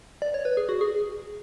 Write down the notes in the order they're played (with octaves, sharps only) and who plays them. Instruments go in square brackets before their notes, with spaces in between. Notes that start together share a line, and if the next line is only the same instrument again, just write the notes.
[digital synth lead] D5
C#5
B4
G#4
F#4
G#4